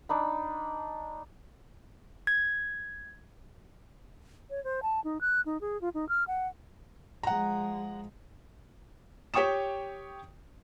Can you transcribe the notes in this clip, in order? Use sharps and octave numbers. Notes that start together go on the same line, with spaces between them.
D4 D#4 B5
G#6
C#5
C5
A5
D#4
F#6
D#4
G#4
F4
D#4
F6
F#5
F3 G#3 F#5 A#5
G4 C#5 G5 C#6 D#6 E7